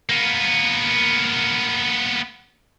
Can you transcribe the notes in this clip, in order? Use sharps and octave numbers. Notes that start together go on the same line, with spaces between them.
A#3 B3